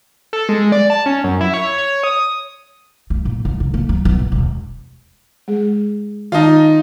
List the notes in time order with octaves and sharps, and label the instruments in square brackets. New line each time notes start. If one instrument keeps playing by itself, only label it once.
[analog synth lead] A4
G#3
D5
A5
C#4
F#2
E4
C#5
C#5
D#6
[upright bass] A3
A#2
F1
C3
A#3
F#3
B3
A#1
E1
[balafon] G#3 G#4
[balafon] D#3 A5 [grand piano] D#4 F4